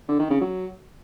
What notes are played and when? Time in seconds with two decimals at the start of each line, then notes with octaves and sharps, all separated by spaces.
0.08 D3
0.19 D#3
0.30 C#3
0.41 F#3